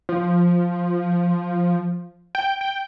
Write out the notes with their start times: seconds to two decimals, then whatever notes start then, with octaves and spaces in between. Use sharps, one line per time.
0.09 F3
2.35 G5
2.61 G5